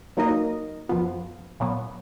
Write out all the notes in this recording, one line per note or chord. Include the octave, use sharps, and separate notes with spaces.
F#3 A#3 D#4 A#4 D#5
F#2 F3 B3 F4
A#2 F#3 B3